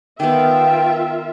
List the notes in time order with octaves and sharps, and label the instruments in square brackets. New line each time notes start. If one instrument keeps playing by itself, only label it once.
[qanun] D#3 B3 [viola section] F4 A#4 E5 [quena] G5